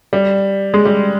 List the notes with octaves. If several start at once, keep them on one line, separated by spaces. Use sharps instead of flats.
G3
G#3
G3